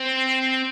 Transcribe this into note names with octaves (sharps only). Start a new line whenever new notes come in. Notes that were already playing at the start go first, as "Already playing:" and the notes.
Already playing: C4